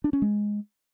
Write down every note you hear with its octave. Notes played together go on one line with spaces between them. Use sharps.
D4
C#4
G#3